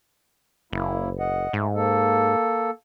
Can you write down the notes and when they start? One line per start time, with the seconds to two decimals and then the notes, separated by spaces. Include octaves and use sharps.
0.73 F#1 A#3 E4
1.19 D#5 F#5
1.53 G#2 A3
1.75 A#3 A4